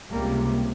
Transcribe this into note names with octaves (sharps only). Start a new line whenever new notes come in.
C#2 C3 G3 A#3